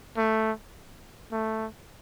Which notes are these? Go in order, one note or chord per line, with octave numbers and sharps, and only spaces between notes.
A3
A3